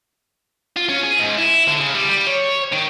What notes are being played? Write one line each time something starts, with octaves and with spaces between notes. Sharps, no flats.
F4
C#4
G#4
G#2
E4
D3
C#3
G3
G3
C#5
D#3